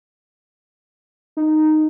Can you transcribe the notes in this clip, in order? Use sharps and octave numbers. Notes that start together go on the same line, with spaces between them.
D#4